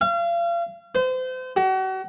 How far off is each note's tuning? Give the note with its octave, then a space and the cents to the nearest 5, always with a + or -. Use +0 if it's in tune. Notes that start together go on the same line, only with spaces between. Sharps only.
F5 -35
C5 -35
F#4 +40